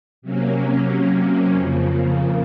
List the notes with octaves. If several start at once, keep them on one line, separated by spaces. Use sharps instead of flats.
C3 F#3 A#3 C#4
F2 C#3 F3 A#3